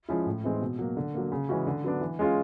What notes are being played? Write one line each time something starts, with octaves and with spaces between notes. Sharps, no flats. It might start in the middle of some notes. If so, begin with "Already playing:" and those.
F3 G#3 C#4 E4
A2
E3 G#3 C4 D#4
B2
F#3 A#3
D3
F#3 A#3
C#3
E3 G#3 C#4 F#4
D3
F#3 B3 D4
E3
G#3 C#4 F4 G#4